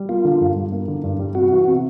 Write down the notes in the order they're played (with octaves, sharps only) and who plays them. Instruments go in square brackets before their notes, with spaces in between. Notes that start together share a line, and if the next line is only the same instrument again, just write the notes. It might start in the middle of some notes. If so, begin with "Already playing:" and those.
Already playing: [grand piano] G3
[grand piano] A#3 [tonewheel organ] F4
[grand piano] D3
G2
G3
A#3
D3
G2
G3
[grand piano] C3 [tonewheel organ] F#4
[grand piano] E3
C3